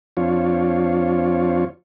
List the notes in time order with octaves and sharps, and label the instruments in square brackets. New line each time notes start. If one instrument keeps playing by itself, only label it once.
[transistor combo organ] F2 F3 C4 D4 F4 C#5